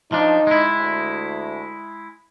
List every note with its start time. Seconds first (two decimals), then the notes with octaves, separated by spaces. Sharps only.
0.12 F3 D4 D#4
0.47 G#3 E4
0.79 D2